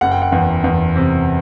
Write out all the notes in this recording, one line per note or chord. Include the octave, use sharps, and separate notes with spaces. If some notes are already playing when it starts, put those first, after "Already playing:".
F#1 F#5
G5
F#5
E2
E2
C3